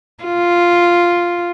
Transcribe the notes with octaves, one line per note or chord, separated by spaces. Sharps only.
F4